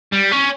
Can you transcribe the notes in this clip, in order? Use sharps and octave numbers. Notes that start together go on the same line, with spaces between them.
G3
C#4